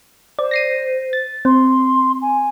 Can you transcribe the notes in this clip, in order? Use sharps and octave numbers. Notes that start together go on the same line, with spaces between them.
C5 D5
A#6 C7 D#7
A6
C4 C6
G#5